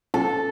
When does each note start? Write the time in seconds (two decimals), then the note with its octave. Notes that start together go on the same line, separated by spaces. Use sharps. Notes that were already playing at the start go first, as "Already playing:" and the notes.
0.14 A4